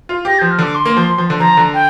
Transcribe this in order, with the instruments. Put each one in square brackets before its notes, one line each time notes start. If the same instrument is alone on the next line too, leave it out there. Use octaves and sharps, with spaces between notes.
[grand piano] F4
[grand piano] G4 [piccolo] A#6
[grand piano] F3 [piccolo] G6
[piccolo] F6
[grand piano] D3 [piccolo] D6
[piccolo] C6
[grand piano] A#3
F3
F3
D3
[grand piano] F3 [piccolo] A#5
[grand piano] D3
[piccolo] G5